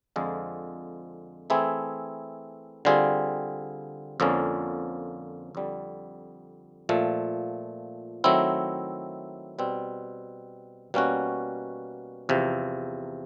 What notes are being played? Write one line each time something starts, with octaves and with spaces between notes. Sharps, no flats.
F2 D3 F3 G#3
E3 A3 C4 E4 G#4
D3 G3 C4 F4 G#4
F2 D3 F3 A#3 C#4
F2 D3 G3
A#2 F3 A3
D#3 F#3 A3 C4 E4
B2 G3 C4
B2 G3 A#3 C#4 F#4
E2 C3 F3